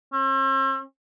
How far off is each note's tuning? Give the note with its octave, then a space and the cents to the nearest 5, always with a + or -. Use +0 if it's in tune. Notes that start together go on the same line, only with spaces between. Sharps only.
C4 +45